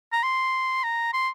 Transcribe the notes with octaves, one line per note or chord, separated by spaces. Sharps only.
A#5
C6
A#5
C6